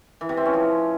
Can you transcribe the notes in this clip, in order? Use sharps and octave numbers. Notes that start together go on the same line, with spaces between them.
E3
C3
C4
C#4
F3